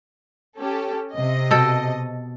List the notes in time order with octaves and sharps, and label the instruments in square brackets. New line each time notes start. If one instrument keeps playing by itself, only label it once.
[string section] C#4 G4 A4
C3 D#5
[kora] B2 A4 G5